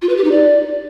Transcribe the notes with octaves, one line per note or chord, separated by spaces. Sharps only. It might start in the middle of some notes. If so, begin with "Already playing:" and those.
F4
B4
G4
D#4
D5